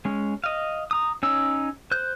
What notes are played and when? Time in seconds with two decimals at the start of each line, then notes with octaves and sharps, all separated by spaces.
0.05 G#3 C#4
0.44 D#5 F5
0.91 A#5 D#6
1.23 C#4 D#4 C#5 E6
1.91 C5 F#6 G6